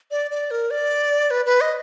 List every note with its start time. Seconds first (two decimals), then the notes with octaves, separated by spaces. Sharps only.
0.11 D5
0.31 D5
0.51 A#4
0.71 D5
1.31 B4
1.46 B4
1.61 D#5